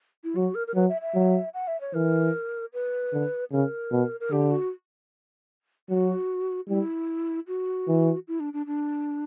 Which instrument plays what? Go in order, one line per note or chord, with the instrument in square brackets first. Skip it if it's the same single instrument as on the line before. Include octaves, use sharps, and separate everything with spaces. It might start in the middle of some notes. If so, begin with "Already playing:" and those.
[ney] E4
[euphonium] F#3 [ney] F#4
[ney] A#4
A#4
[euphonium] F#3 [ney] B4
[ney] E5
E5
[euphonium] F#3
[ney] F#5
E5
C#5
[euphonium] E3 [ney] A#4
[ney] B4
[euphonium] D3
[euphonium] C#3 [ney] A#4
[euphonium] B2
[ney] A#4
[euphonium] D3 [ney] G4
[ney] F#4
[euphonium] F#3 [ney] F#4
[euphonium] G3 [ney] E4
[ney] F#4
[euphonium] E3
[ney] E4
D4
D4
D4